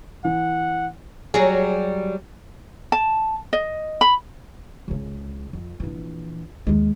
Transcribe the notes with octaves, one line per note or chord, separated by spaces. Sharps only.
E3 F#5
F#3 G3 G#4
A5
D#5
B5
C#2 C#3
F2
A#1 E3
D#2 G#3